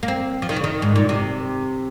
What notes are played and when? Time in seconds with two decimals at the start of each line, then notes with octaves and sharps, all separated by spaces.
0.03 A#3
0.08 C4
0.42 F3
0.49 D#3
0.56 C#3
0.64 D#3
0.82 G#2
0.96 A#2
1.09 C3